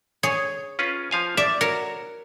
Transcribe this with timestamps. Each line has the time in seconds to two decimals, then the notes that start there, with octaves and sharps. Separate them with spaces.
0.23 G#4 C#5
0.79 C#4 F4 B4
1.11 F3 F5 G#5
1.37 D5 E5
1.61 F#4 A#4 C#5